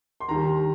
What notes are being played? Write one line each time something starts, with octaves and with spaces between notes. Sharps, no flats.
C6
D#2 D#3 G3 A#5